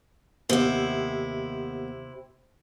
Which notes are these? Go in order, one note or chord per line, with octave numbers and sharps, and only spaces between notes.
D#2 C3 B3 E4